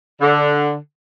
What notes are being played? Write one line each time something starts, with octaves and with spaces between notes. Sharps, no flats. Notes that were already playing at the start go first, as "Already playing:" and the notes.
D3